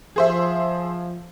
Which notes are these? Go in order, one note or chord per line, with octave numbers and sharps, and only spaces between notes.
F3 G#4 C5 E5